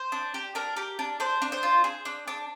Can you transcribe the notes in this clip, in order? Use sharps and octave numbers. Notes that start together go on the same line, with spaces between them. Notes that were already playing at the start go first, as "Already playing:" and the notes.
Already playing: C5
D4
G4
D4 A#4
G4
D4
D4 C5
D4
C5
F4
G#4
D4
D4